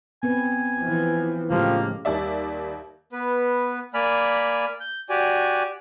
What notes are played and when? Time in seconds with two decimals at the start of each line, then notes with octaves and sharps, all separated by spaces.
0.23 B3 C4 B4 G#5
0.80 E3 F3
1.50 A2 C#3 F3 G#3 A#3 G4
2.05 D#2 G3 D5 E5
3.13 B3 B4
3.94 A#3 D5 G#5 B5 F6
4.80 G6
5.10 F#4 G4 D5 G#5